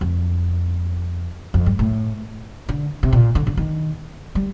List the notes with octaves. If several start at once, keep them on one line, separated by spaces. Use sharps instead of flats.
F2
F2
G2
A2
D3
C3
A#2
D3
D3
D#3
G3